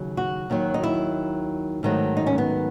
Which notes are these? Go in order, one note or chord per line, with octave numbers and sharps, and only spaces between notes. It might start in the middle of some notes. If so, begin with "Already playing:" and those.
Already playing: D#2 C#3 F#3
F#4
D#2 D#3 F#3
D#4
E4
G#2 D#3 F#3 A3
D#4
C#4
B3